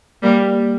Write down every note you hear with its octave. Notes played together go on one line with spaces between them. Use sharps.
G3 A#3